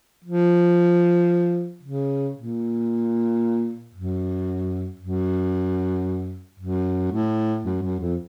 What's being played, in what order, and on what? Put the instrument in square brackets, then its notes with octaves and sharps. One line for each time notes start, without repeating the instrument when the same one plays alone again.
[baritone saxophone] F3
C#3
A#2
F#2
F#2
F#2
A2
F#2
F#2
F2